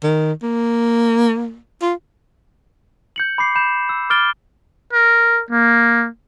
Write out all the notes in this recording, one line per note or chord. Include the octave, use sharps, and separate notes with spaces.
D#3
A#3
F4
G6 C#7 F#7
B5 D6 C7
B5 G6 E7
E6
D6 F6 A6 D7 G7
A#4
A#3